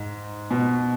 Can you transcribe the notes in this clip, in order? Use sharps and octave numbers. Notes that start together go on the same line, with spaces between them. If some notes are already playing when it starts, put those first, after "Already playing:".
Already playing: G#2
B2